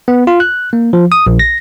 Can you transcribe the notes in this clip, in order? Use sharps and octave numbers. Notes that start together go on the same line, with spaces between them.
B3
F4
F#6
A#3
F3
D#6
A#1
A#6